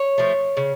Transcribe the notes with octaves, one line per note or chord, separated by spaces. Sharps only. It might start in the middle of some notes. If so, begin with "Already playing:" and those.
Already playing: C#5
F3 A3
C#3